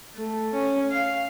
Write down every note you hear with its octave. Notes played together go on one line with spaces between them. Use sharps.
A3
C#4
F5